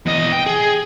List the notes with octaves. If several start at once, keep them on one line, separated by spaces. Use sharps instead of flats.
E2 D#5
G5
G#4